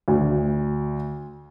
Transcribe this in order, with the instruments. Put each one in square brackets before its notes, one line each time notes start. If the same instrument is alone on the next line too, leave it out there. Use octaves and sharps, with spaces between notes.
[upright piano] D2